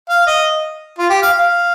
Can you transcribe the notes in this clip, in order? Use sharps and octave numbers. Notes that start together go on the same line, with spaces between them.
F5
D#5
F4
G4
F5
F5